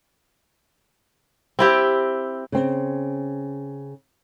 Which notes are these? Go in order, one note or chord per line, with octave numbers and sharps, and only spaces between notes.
C4 E4 G4
C#3 C4